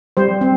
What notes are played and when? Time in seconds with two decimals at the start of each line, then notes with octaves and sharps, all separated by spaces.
0.17 G3 C5
0.41 C4